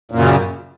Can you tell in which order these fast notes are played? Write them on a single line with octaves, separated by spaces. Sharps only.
A#2 F#2 C#3